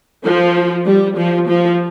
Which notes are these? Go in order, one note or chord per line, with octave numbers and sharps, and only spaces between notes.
F3
G3
F3
F3